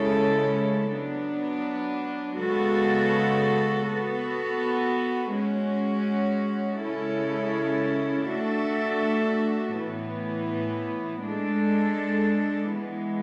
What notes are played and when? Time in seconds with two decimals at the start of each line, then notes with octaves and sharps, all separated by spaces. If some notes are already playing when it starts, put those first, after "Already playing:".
Already playing: C#3 G#3 C#4 E4 A4
0.90 F#3 B3 D4
2.38 C#3 G#3 B3 F#4 A4
3.86 B3 F#4 A4
5.33 G#3 C#4 F#4
6.81 C#3 G#3 C#4 E4 A4
8.28 A3 D4 F#4 A4 E5
9.76 A2 E3 B3
11.24 G#3 D4 A4
12.72 E3 G#3 B3